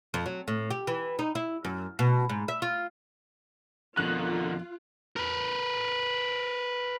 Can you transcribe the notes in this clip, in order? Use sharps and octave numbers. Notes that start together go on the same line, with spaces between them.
F2
F#3
A2
G4
E3
D#4
E4
F#2
B2
G#2
E5
F4
F2 B2 D3 D#3 F4 F#6
A#4 B4